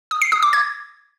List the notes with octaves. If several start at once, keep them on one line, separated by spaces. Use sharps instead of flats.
D#6
C7
D#6
D6
G#6